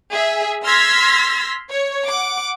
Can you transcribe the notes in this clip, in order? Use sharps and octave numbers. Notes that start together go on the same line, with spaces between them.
G#4 E5
C6 E6 F6 G#6 A#6 B6
C#5
F#5 D6